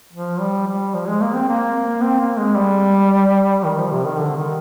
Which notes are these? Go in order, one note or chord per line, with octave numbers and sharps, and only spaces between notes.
F3
G3
G3
F3
G#3
A#3
C4
A#3
C4
A#3
G#3
G3
D#3
F3
C3
D#3
D3
D#3